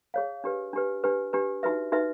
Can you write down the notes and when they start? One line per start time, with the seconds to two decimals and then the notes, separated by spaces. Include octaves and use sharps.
0.14 G#4 C#5 F5
0.44 D4 G4 B4
0.73 D4 G4 B4
1.04 D4 G4 B4
1.33 D4 G4 B4
1.63 D#4 F#4 B4 E5
1.92 D#4 F#4 B4 E5